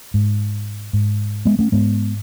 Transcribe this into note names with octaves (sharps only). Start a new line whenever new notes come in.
G#2
G#2
G#3 B3
A3 C#4
G#2 G#3 B3